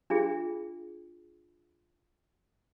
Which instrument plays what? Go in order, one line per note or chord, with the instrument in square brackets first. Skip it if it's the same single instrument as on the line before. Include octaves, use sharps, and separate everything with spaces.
[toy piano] D4 F4 G#4